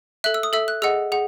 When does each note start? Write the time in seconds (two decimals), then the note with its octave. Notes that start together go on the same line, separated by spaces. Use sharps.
0.24 A4 E5 F#6
0.34 E6
0.43 D#6
0.53 A4 E5 E6
0.68 F#6
0.82 G#4 D#5 F#5 E6
1.12 G#4 F#5